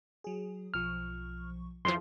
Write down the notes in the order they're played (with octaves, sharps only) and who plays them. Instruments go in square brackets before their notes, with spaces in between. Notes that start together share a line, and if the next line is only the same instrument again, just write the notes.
[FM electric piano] F#3 G#4
[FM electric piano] B1 F3 C#6 [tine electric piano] F6
[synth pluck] F2 E3 F3 [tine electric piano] C6